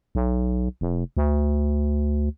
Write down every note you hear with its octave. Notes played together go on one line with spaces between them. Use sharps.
B1
F1
D2